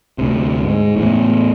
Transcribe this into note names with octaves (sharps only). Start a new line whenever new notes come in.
D2 C3
G#2
E2 A2